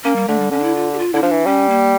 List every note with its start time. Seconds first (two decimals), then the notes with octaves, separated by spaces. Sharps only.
0.04 A#3 C#4
0.16 G3
0.28 D3 A3
0.39 G3
0.51 D3 C#4
0.59 D4
0.63 E4
0.75 F4
0.93 G4
0.99 F4
1.13 D3 E4
1.23 F3 D4
1.31 E3
1.46 G3 C#4
1.69 A#3